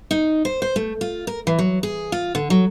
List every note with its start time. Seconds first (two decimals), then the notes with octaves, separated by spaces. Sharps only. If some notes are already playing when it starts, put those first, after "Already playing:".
0.11 D#4
0.45 C5
0.62 C5
0.76 A3
1.01 F4
1.27 A#4
1.47 E3
1.59 F#3
1.83 G#4
2.12 F4
2.35 D3
2.50 F#3